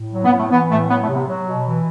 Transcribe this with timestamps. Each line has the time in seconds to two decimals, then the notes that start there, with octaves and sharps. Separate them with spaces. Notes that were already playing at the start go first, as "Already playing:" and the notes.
Already playing: A2
0.13 F#3
0.25 B3
0.31 A2
0.38 A3
0.51 E3 B3
0.69 A2 A3
0.89 F#3 B3
1.02 A3
1.08 C3
1.14 B3
1.27 F#3
1.46 B2
1.65 E3